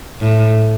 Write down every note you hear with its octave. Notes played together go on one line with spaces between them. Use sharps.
A2